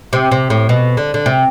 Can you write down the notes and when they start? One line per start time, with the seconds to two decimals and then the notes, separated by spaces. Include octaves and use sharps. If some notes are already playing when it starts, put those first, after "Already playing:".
0.13 C3
0.31 C3
0.50 A2
0.69 B2
0.97 D3
1.14 D3
1.26 C3